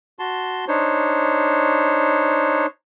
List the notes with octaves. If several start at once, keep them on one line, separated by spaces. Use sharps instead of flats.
F#4 A5 C6
D4 D#4 C5 C#5